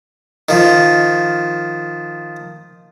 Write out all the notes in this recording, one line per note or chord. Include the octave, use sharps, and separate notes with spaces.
D#3 F3